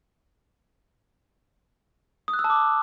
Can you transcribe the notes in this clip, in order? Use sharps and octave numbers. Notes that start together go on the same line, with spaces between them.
D#6
F#6
E6
A5
D6